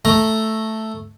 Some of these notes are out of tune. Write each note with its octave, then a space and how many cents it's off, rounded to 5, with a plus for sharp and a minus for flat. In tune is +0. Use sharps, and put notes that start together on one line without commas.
A3 +0 A#5 +0